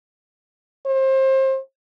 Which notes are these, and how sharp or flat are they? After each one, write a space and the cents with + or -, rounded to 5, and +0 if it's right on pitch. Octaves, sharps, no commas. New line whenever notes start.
C5 +30